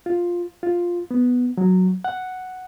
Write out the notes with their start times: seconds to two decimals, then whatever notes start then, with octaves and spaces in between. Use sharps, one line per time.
0.06 F4
0.63 F4
1.11 B3
1.57 F#3
2.04 F#5